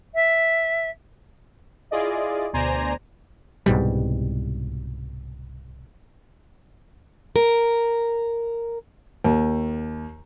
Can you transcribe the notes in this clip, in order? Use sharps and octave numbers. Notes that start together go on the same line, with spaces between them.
E5
E4 F4 G#4 D5 D#5
D2 B2 C5 D5 G#5 A#5
C2 G#2 B2 G3
A#4
D#2